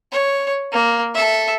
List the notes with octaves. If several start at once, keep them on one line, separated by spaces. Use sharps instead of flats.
C#5
A#3
A4 E5